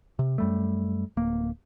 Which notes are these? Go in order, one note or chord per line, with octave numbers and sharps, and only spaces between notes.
C3
F#2 G3 A3
D1 A#3